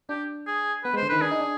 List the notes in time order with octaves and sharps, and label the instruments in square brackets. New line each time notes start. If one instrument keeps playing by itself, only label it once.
[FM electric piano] D4 [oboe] G4
[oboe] G#4
[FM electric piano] B3 [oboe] B4
[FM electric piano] G#3 [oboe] C5
[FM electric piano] D3
[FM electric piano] D#3 [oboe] B4
[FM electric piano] D4 [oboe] G#4
[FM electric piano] D#4
D4